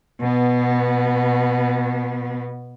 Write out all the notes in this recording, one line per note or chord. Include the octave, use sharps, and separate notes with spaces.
B2 B3